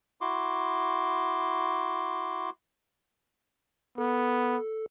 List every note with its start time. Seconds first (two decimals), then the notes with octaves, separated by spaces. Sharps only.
0.21 E4 F#4 C6 D6
3.98 B3 A4